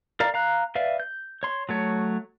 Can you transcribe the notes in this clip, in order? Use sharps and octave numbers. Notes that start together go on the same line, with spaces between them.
A#4 D5 F5 A#5
F5 A#5 F#6
B4 D5 E5 F5
G6
C#5 C6
F#3 A3 C#5